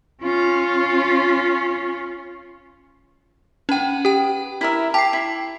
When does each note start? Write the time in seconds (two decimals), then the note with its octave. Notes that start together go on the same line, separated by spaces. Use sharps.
0.23 C#4 F4
3.69 C#4 B4 F#5 G5
4.05 G4 G5
4.61 E4 A#4 E5
4.94 G4 A5 C7
5.13 E4